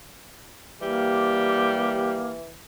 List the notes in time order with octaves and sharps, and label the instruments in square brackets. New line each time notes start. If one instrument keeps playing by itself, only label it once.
[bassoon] E3 [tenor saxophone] G3 [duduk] A#3 [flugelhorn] G4